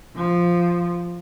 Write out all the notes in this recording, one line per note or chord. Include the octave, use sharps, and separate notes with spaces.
F3